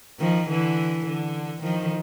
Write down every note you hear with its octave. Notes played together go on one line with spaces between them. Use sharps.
D#3 F3
D3 E3
D3
D#3 F3